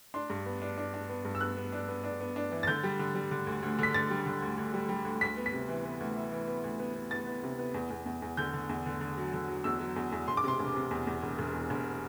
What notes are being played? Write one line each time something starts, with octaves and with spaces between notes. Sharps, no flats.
D4 C6
G2
B3
D4
D4
D4
B3
G2
E6
B3 F#6
B3
D4
B3
D4
B3
D4
E3
A6
D3 G6
G3
D3
G3
D3
D2
D2
D3 B6
D3 A6
G3
D3
D2
D2
G3
G3
D2
D2 B6
B3
B6
C3
E3
B3
D2
E3
E3
B3
D2
B3
B3
B3 A6
B3
C3
B3
E2
E2
E2
E2
D3 G6
D3
E2
D3
D3
F#3
D3
F#3
E2 E6
F#3
E2
E2
E1 C6
D6
C3 C6
E1
C3
E2
E2
E1
E1
E2
E1